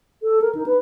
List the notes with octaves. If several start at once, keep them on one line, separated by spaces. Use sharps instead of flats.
A4
A#4
D#4
B4